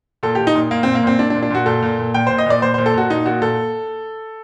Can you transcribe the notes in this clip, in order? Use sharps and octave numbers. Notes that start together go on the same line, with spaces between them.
A#2 A4
A#2 G4
D#4
A#2
A#2 A#3
A#2 C4
A#3
A#2 C4
A#2 D4
D4
A#2
D4
A#2 F#4
A#2 A4
A#2
A#2
A#2 G5
A#2 C5
D#5
A#2 D5
A#2 C5
A#2 C5
A4
A#2 F#4
A#2 D#4
A#2 F#4
A#2 A4